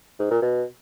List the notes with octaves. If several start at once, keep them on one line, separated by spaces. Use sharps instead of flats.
G#2
A#2
B2